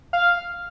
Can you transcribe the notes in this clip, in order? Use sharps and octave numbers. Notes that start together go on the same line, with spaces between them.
F5